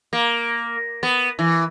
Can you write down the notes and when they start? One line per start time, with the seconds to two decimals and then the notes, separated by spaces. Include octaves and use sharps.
0.13 A#3
1.03 B3
1.39 E3